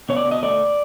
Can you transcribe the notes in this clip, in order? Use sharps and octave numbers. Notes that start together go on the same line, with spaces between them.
B2 C#5
D5
B2
D#5
A3 D5